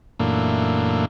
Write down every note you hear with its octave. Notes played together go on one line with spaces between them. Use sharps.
F#2 A#2 E3 A3 A#3 D4